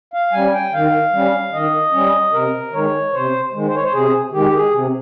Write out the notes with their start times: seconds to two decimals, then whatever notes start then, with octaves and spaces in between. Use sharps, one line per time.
0.13 F5
0.32 G3 C#4 G#5
0.52 G5
0.73 D#3 F5
1.13 G3 C#4
1.53 D#3 D#5
1.92 G3 C#4
2.32 C3 A#4
2.72 D#3 G#3 C#5
3.13 C3 C5
3.53 D#3 G#3
3.67 C5
3.75 C#5
3.84 C5
3.92 C3 G#4
4.32 D#3 G#3 G4
4.53 G#4
4.73 C3